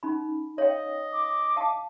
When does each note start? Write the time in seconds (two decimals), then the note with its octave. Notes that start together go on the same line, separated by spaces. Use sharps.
0.03 C#4 D#4 B5
0.58 C#5 D#5 F5 G5
1.12 D6
1.56 F5 F#5 A5